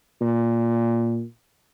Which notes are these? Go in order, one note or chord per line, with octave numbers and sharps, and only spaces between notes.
A#2